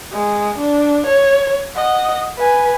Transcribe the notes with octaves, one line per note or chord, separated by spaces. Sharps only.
G#3
D4
C#5
D#5 F#5
B4 G#5